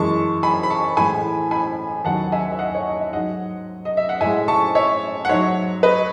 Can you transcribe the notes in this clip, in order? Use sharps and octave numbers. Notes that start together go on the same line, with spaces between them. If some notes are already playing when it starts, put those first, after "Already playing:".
Already playing: F#2 E3 G#3 A5 C#6
G#5 B5
B5
A5 C#6
A2 E3 G#3 G#5 B5
G#5 B5
D#2 D#3 F#3 F#5 A5
E5 G#5
E5
D#5 F#5
C#5
D#5
E5
G#2 F#3 D#5 F#5
D#5
E5
F#5
A2 G#3 E5 G#5
A5 C#6
C#5 E5
F#5
G#2 F#3 C#5 E5
B4 D#5